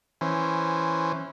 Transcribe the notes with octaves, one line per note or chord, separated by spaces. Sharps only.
E3 C#4 C5